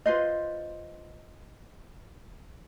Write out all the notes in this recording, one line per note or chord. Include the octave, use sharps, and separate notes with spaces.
F4 B4 C5 D#5